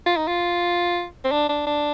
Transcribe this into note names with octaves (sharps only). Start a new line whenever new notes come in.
F4
D#4
F4
C4
D4
D4
D4